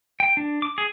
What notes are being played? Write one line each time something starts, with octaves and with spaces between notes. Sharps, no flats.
G5
D4
D6
G#4